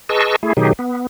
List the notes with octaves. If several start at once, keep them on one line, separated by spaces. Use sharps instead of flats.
G#4 B4 D#5 A5 C#6 E6
A3 E4 G#4
B2 D#3 F#3 D#4 G4 G#4
B3